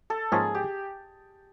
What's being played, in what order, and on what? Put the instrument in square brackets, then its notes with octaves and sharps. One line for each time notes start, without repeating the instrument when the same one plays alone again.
[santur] A4
[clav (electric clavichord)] G#2 F3 A#3 C#4 F4 [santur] G#4
[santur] G4